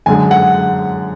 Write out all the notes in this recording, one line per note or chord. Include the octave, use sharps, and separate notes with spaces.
F#2 D3 G#3 G#5
F#5